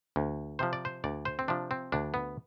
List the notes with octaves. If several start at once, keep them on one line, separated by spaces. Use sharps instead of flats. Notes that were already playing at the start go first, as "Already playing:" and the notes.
D2
C3 F3 C5
D5
C5
D2 D5
C5
C4
C3 F3 D4
C4
D2 D4
B3